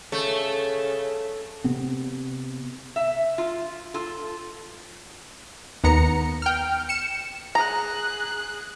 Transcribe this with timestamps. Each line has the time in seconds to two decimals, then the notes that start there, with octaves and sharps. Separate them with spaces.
0.12 C#3 A3
1.64 C3 B3 C4
2.96 E5
3.38 F4
3.94 F4 A4
5.84 D#2 B3 A#5 C#7
6.42 G5 F6
6.89 C#7 E7
7.55 G#4 A#5 F#6